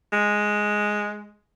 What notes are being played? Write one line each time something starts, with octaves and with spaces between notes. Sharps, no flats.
G#3